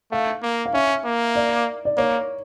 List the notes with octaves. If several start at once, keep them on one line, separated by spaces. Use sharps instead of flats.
A3 F5
A#3
F5
C#4 E5
A#3
D5
D5
A#3 C#5